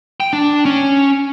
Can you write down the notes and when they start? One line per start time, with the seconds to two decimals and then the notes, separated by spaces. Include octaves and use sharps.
0.20 G5
0.33 D4
0.65 C#4